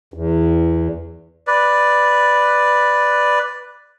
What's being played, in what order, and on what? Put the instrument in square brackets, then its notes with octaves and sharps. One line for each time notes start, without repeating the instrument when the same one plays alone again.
[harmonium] E2
[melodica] B4 D5